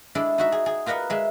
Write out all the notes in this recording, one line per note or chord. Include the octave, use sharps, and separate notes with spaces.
G#3 D4 E4 A4
D#4 F#4 E5
G#4
G#4
F4 A#4 B4 D#5 F#5
G#3 E5